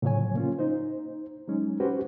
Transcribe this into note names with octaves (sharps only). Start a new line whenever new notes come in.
A2 C#3 F3 F#3 C#5 G#5
A#3 C#4 F4
D#4 C5
F#3 G#3 C#4 D#4
C#4 F#4 G4 B4 C5